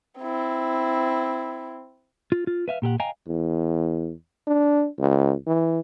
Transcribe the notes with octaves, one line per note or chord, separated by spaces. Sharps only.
C4 E4
F4
F4
B4 E5 F5
A#2 G4 A4 F#5
D#5 F5 G5 G#5 A#5
E2
D4
C#2
E3